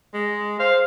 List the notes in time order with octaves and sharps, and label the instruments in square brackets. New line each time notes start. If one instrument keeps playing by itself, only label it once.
[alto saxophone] G#3
[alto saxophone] C5 [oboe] F5